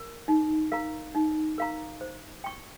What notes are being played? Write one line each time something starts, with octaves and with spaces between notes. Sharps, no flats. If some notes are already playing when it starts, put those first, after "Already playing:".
Already playing: A#4
D#4
A#4 F5 A#5
D#4
A#4 F5 A#5
C5
G5 C#6